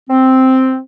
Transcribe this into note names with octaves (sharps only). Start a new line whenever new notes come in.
C4